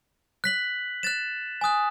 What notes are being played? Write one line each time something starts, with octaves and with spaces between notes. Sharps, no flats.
F#6 B6 F#7
F#6 A6 E7
G#5 D#6 F#6